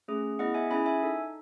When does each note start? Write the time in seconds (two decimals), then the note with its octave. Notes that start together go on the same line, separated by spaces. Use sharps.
0.08 A3 C#4 G#4
0.39 B3 E4 G#4 D#5 F#5
0.54 E5 G#5
0.71 C#4 E4 G#4 G#5 B5
0.86 E5 G#5
1.03 D#4 A4